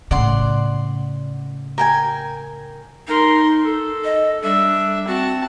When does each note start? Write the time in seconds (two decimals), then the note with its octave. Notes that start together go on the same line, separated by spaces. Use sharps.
0.11 A2 C#3 D5 F#5 C6
1.78 A#4 G5 G#5
3.08 D#4 A#4 C6
3.64 A4
4.04 D#5
4.43 G3 D4 E5
5.07 C4 F#4 A5